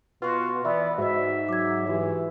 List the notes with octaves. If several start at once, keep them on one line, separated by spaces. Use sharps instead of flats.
B2 F4 F#4 B4 C6
E3 B3 D5 E5 B5 E6
G#2 F#4 C5 D#5 E5
F#3 D6 G#6
E3 F#4 G4